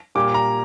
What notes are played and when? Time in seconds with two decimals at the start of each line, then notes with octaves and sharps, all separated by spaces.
0.15 A#2 G3 A#3 D6
0.34 A#5